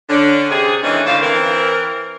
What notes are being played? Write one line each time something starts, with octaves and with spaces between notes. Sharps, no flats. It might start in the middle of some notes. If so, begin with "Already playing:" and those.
D3 C#4 D4
C3 G#4
D#3 E3 G#3 A3 C#4 D4
A2 D3 A4 C5 F5
E3 C4 A#4